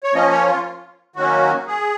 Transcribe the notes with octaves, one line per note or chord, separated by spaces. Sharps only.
C#5
F3 A#3 C#4 D#5
C#5
F4
D#3 F#3 A#3 C#4 F#4
G#4